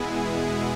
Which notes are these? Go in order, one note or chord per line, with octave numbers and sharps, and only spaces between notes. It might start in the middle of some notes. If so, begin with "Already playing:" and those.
Already playing: E2 B2 G#3 B3 E4 G#4